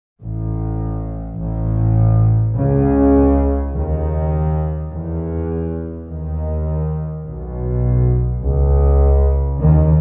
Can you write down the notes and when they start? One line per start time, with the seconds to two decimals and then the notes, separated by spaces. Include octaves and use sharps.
0.22 A1 A2
1.39 A1 A2
2.56 C#2 C#3
3.73 D#2 D#3
4.90 E2 E3
6.08 D#2 D#3
7.25 B1 B2
8.42 C#2 C#3
9.60 D#2 D#3